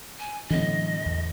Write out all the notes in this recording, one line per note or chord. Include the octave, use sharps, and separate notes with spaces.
G#5
A2 D3 E3 F#3 B3 D#5
E2